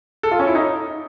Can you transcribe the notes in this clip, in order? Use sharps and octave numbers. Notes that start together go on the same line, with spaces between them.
A4
F4
C#4
E4
D#4